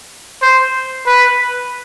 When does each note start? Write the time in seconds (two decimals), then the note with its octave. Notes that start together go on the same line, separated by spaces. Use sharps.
0.42 C5
1.07 B4